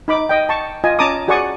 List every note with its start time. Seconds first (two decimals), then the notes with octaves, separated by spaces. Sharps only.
0.08 D#4 B5 D6
0.29 D#5 G5
0.49 A5 C#6
0.84 F4 D#5 G#5
0.99 C#4 A5 A#5 D6 D#6
1.28 F#4 G#4 D5 F#5 C#6 D#6